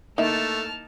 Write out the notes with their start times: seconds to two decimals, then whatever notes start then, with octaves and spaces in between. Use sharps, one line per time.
0.18 A3 A#3 D#4 E4 E5 A5 F6